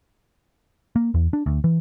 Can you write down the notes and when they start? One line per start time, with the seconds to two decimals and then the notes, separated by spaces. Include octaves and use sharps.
0.96 A#3
1.14 E2
1.33 D4
1.46 D2
1.64 E3